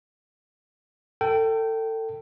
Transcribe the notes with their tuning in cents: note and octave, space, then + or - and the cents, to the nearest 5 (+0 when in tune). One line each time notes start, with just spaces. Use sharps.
A4 +30 G5 -15